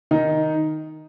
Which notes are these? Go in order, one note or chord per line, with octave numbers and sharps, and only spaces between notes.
D#3 D#4